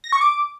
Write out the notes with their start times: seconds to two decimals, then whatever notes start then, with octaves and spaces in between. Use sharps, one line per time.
0.04 A#6
0.12 C#6
0.21 D6